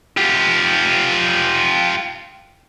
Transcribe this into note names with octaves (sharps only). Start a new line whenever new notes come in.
F4 G4